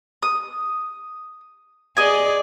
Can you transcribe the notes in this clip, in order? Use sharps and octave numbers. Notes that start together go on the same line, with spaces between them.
D#6
G#4 D5 D#5 G#5